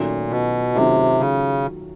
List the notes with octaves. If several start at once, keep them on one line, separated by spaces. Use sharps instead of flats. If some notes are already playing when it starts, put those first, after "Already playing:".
Already playing: A#2 D#3 F#3 A3 C#4 F4
B2
C3 D#3 F#3 A3 C#4 F4
C#3